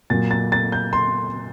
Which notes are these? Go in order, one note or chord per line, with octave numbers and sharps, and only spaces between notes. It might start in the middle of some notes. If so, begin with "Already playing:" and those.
A#2 F#3 A6
A6
A6
G6
C6